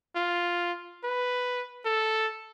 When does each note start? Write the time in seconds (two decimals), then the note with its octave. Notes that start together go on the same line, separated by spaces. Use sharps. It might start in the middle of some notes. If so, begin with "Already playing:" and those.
0.16 F4
1.04 B4
1.86 A4